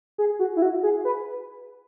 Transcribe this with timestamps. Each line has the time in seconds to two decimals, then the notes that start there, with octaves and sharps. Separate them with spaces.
0.18 G#4
0.39 F#4
0.56 E4
0.62 F#4
0.83 G#4
1.05 B4